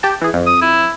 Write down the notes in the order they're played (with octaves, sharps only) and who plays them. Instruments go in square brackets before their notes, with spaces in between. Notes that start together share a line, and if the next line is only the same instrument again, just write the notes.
[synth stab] G4 G5 A5
E3 G#4
F2
[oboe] D#6
E4